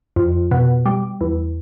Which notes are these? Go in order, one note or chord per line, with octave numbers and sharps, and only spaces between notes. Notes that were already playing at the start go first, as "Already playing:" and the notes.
F2
B2
G3
E2